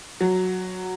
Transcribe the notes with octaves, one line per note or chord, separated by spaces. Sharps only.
F#3